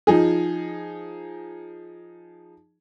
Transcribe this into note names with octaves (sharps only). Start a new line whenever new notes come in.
F3 D#4 G#4